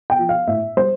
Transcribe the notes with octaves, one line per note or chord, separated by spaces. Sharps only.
G5
F3
F5
A2 E5
G3 C5